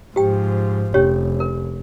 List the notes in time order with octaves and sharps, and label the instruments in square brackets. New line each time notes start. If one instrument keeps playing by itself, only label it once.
[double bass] G#2 F3 [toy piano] G4 G5
[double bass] F1 [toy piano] C#4 G4 C#5
[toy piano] A#4